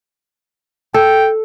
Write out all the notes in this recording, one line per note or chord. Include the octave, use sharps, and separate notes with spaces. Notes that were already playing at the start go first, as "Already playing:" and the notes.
A4 G5